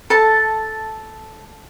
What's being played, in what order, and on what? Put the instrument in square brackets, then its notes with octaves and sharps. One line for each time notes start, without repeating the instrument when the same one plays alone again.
[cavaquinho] A4 A5